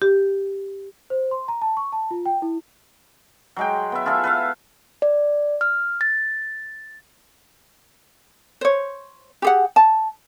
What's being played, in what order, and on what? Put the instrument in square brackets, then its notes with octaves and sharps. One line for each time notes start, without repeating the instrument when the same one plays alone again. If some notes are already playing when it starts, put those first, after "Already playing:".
[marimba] G4
[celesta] C5
C6
A#5
A5
C#6
A5
F4
G5
E4
[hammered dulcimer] F#3 G#3 G5
B3 E5
F4 G#4 A4 E5
B4 E5 F5
[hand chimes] D5
F6
A6
[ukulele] C5 C#5
G4 G#4 F#5
A5